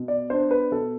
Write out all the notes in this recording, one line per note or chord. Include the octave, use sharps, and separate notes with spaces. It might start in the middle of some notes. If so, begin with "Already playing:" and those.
Already playing: B2
D5
B3 D4 C5
B4
B2 A4